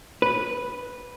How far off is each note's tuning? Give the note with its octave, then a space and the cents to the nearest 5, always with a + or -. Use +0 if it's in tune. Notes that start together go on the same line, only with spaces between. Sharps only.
B4 -5